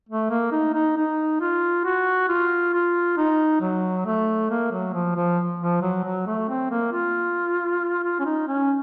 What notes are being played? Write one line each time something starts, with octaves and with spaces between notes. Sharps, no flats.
A3
A#3
D#4
D#4
D#4
F4
F#4
F4
F4
D#4
F#3
A3
A#3
F#3
F3
F3
F3
F#3
F#3
A3
C4
A#3
F4
F4
C#4
D#4
C#4